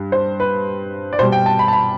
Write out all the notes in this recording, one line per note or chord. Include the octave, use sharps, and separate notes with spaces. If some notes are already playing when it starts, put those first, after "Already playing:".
Already playing: G2
C5
B4
D5
B2 G3 C5
G5
A5
B5
A5
B5